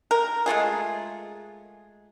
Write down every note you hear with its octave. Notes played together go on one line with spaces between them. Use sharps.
A#4
G#3 A3 F4 G#4